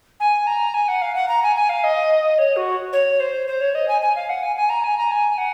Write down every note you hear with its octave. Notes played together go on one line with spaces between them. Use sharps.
G#5
A#5
G#5
F#5
F5
F#5
A#5
G#5
G#5
F5
D#5
C#5
F#4
C#5
C5
C5
C#5
D#5
G#5
G#5
F5
F#5
G#5
G#5
A#5
G#5
A#5
G#5
F#5